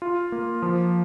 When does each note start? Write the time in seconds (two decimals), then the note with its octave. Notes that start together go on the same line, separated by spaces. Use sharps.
0.02 F4
0.32 A#3
0.62 F3